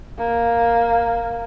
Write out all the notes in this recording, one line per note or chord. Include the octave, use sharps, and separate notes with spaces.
A#3